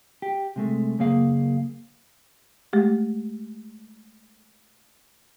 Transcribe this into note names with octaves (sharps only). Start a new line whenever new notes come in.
G4
C3 G#3 A3
F#2 C#3 A#3 G#4 F5
G#3 A3 G4